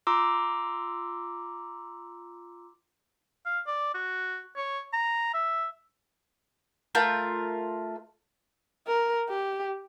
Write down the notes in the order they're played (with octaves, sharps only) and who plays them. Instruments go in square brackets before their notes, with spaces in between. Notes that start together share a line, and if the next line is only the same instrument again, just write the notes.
[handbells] F4 A#5 C6 D6 E6
[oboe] F5
D5
F#4
C#5
A#5
E5
[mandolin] A3 F4 A#4 G6
[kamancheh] A#4
G4